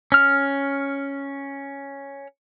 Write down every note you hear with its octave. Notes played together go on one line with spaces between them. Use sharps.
C#4 F6